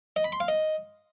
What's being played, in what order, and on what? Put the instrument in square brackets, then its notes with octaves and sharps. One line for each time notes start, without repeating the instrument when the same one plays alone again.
[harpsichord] D#5
B5
C6
F5
D#5